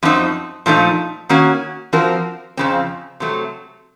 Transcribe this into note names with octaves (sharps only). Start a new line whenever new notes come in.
F#2 F3 C4 D#4
A#2 F3 A3 D#4
D#3 A#3 C#4 F#4
F3 C4 F#4 A#4
F2 C#3 F3 C4
C3 F#3 A3